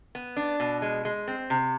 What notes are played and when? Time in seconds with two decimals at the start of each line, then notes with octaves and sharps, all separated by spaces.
0.15 B3
0.37 D4
0.60 B2
0.82 G#3
1.05 G#3
1.28 C4
1.50 C3